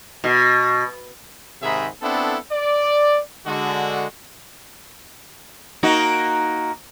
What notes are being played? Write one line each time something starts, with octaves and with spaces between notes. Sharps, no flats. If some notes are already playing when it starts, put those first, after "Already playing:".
B2
G#2 C3 D#3 G#4 E5 B5
B3 C4 D4 E4 A4
D5
D3 G#3 F#4
A#3 D#4 F#4